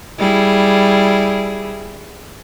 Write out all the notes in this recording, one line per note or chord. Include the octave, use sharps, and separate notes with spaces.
G3 E4 G#4